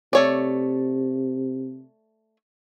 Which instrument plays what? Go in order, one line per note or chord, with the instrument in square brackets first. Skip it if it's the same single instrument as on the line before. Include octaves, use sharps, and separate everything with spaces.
[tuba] C3 [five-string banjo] A3 C#5 D5